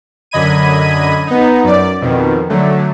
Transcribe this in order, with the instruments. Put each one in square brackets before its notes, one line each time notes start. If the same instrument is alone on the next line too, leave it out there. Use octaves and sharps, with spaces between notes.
[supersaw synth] F#2 D3 D#5 B5 G#6 D#7
B3 D#4
F#2 D5
F2 B2 D#3
D3 F#3 A3